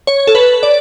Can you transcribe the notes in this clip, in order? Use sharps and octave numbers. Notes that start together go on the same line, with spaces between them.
C#5
A4
B4
D5